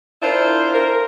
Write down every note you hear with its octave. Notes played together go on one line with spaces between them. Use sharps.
D4 E4 F4 A#4 C5
A#4